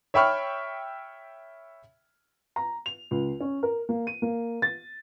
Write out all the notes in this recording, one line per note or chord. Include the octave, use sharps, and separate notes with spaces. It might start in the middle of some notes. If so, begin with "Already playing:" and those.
C#5 E5 G5 B5 C#6 F6
A#5
F7
C#2
C#4
A#4
A#3
D#7
A#3
A6